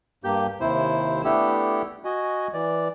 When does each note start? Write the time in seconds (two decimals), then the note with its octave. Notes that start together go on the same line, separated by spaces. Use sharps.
0.24 G2 A#3 G4 G6
0.60 D#2 C3 E4 C5
1.24 A3 B3 D4 E4 G4 A4
2.04 F#4 D#5 G#5
2.53 E3 D5